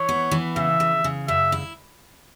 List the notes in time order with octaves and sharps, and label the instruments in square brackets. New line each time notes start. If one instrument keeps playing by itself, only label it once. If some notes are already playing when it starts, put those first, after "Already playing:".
Already playing: [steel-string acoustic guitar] E3 [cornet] C#5
[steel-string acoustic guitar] B3
E3
[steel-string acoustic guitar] C#3 [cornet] E5
[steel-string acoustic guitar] C#3
C#3
[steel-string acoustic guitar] F#2 [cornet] E5
[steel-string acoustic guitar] E4